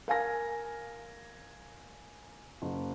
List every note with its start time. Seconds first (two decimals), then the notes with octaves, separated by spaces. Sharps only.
0.08 A#4 F5 G#5 A#6
2.62 F#1